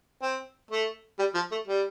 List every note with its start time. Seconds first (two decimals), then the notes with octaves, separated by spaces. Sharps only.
0.22 C4
0.71 A3
1.19 G3
1.35 F3
1.52 A3
1.68 G3